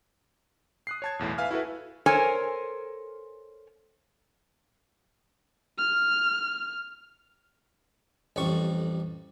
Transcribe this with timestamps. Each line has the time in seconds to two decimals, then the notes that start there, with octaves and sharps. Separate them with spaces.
0.87 D#6 F#6 C7
1.02 C#5 A5 G#6
1.19 B1 E2 A2
1.38 B4 E5 F5 G#5 F6
1.51 E4 F#4 A4 B4
2.06 A4 A#4 C5 C#5 G#5
5.78 F6
8.36 A1 F2 G3 C#6